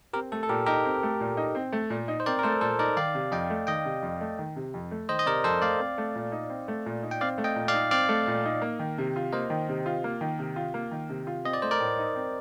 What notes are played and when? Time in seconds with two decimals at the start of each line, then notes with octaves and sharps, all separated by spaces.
0.13 C4 G4 A#4
0.32 A3 A4
0.43 A4
0.49 A#2 G4 A#4
0.66 D#4 G4 A#4
0.85 C4
1.03 A3
1.21 A#2
1.37 D#4
1.55 C4
1.73 A3
1.90 A#2
2.08 D#4
2.20 C5
2.26 C4 A#4 D5
2.39 A#4
2.43 A3 A4 C5
2.61 A#2 A4 C5
2.79 D#4 A#4 D5
2.97 D#3 D5 F5
3.15 C3
3.32 F2 D#5 G5
3.50 A3
3.67 D#3 D#5 G5
3.85 C3
4.03 F2
4.21 A3
4.39 D#3
4.56 C3
4.74 F2
4.91 A3
5.09 D#3 C5 D#5
5.19 D#5
5.26 C3 A#4 D5
5.44 F2 A4 C5
5.61 A3 D5 F5
5.79 C4
5.98 A3
6.15 A#2
6.32 D#4
6.50 C4
6.68 A3
6.86 A#2
7.03 D#4
7.11 G5
7.21 C4 D5 F5
7.38 A3
7.44 D#5 G5
7.56 A#2
7.68 D5 F5
7.73 D#4
7.91 C4 D5 F5
8.09 A3
8.28 A#2
8.45 D#4
8.62 A#3
8.79 D#3
8.98 C3
9.16 F4
9.32 A#3 C5 D#5
9.50 D#3
9.69 C3
9.86 F4
10.04 A#3
10.21 D#3
10.39 C3
10.56 F4
10.74 A#3
10.91 D#3
11.09 C3
11.27 F4
11.45 C4 D#5
11.53 D5
11.62 A3 C5
11.71 A#4 D5
11.80 A2
11.98 D#4
12.15 C4